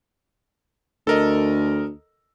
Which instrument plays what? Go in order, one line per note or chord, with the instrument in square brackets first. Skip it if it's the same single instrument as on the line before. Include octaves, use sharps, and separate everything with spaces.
[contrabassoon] D2 [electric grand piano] A4 A#4 D#5